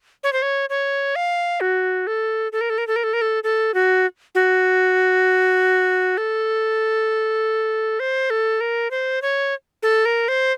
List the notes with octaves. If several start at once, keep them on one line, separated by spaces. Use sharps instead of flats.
C#5
C5
C#5
C#5
F5
F#4
A4
A4
A#4
A4
A#4
A4
A#4
A4
A#4
A4
A4
F#4
F#4
A4
C5
A4
A#4
C5
C#5
A4
A#4
C5